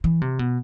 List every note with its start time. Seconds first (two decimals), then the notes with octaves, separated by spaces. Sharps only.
0.04 E3
0.21 C3
0.39 B2